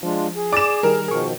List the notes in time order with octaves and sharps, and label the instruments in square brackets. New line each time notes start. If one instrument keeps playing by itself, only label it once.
[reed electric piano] F3 [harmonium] G#3 D4 F4
[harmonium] G#4
[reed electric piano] D5 A6 [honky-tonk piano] D6 E7
[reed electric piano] D#3 G3 [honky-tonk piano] A#4
[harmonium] B2 D#3 F3 [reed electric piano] G#4 C#6